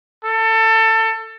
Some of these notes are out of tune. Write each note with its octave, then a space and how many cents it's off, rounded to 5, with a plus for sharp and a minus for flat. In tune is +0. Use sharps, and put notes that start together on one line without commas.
A4 +25